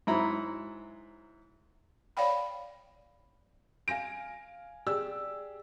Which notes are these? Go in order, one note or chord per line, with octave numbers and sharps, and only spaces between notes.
G#2 F#3 E4 A#5 B5
C#5 D5 F5 G5 B5
F5 G#5 A#6 D7
G4 G#4 D5 E6